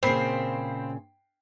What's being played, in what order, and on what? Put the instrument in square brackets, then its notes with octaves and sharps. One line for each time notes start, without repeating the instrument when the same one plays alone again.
[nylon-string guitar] A#2 C#3 [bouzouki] C4 [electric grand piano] C5 B5 C7